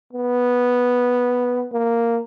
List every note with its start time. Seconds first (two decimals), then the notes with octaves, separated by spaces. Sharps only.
0.13 B3
1.72 A#3